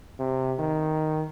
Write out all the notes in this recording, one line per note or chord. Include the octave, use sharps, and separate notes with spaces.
C3
D#3